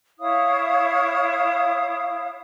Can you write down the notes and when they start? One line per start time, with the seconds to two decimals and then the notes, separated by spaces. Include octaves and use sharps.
0.19 E4 C#5 F5 D#6